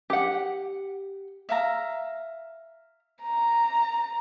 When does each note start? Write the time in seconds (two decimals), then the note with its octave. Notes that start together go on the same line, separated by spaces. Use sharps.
0.10 G4 F#5
1.49 E5 F5 A#5
3.23 A#5